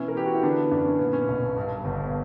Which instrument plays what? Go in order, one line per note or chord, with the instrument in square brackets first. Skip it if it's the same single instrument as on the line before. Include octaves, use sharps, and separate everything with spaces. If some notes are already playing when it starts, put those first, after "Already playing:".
Already playing: [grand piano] B2 E3 C#4 E4
A#4
E3 G4
F#4
E4
D3 B3 D4
F#2 D4
C#4
A#2 B3
C#4
B1
G2
G1